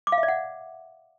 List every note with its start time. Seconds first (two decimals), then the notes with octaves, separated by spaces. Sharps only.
0.07 D6
0.12 F5
0.18 E5
0.23 D5
0.28 F#5